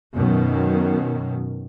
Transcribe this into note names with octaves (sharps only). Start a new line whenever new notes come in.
F#2 B2 D#3